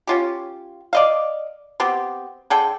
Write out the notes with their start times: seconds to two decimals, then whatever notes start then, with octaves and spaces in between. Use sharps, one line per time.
0.07 C#4 F4 G4
0.93 D5 D#5 F5
1.80 B3 C4 G4
2.50 D3 G#4 A4 G5